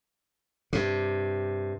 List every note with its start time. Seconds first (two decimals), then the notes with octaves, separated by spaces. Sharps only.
0.73 G2 C3